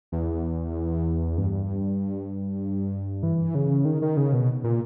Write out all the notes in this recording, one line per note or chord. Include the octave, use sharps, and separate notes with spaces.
E2
G2
E3
C#3
D#3
D#3
C#3
B2
A#2